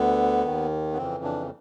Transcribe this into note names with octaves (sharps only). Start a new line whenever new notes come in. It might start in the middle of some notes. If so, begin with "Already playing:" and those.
Already playing: D2 D3 B3
D#2 D#3
B3
F2 C#3 E3 C4
D4